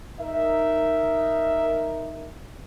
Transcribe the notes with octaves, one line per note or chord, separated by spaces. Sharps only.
D#4 A#4 E5